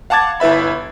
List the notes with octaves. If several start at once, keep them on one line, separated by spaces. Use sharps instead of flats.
F5 F#5 A5 D6 G#6 A6
G1 E4 B4 E5 B5